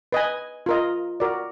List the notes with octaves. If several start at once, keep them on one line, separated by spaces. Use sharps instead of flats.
B4 D#5 G#5
F4 A#4 D#5
F#4 A#4 D5